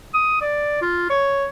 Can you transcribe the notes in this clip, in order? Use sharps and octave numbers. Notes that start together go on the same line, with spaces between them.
D#6
D5
F4
C#5